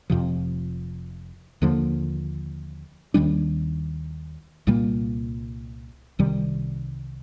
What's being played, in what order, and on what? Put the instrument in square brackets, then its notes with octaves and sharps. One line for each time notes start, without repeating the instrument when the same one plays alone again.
[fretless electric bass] F1 F2 C3 F3
D#2 D3 F3 A#3
D#2 D#3 G3 D4
C2 A#2 G3 A#3
C2 C3 D#3 G3